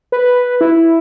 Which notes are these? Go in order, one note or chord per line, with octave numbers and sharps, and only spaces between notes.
B4
E4